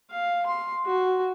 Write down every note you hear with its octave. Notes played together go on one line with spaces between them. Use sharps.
F5
C6
F#4